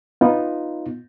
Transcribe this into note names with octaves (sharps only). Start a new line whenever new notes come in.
B3 D#4 F4